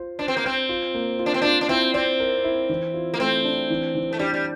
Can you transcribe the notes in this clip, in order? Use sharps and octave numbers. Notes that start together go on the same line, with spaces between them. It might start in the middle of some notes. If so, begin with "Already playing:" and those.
Already playing: F4 C5
D4 C5
C4
A#3
C4 C5
F4
A#3
F4
D4
C4
D4 F4
D4
C4 E4
C4 D5
A#4
E4
E3
F4
A#3
A3 C4
D4
E3
E3
A3
G3 D4
G3